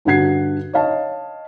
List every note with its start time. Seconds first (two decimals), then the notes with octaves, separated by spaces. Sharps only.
0.05 G2 D3 F#4 F#5 G#6 C7
0.73 C#5 D#5 F5 A5